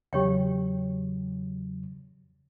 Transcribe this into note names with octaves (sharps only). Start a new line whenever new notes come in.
E2 C#3 F#3 G4 C#5 G5